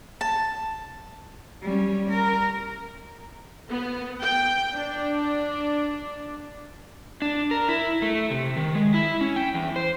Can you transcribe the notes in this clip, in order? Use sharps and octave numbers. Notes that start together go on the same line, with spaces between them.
A5
G3 C#4
A#4
B3
G5
D4
D4
A#4
E4
A3
C3
D#3
G#3
E4
C#4
G5
E2
C5